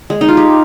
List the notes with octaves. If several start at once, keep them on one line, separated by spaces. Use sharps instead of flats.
G#3
D#4
F4
G4